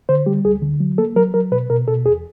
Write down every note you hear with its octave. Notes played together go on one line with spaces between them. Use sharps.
D3 C5
G3 G4
D2 G#4
D3
F#3
A#3 A4
F#3 A#4
F#3 A#4
B2 B4
B2 A#4
B2 A4
E2 G#4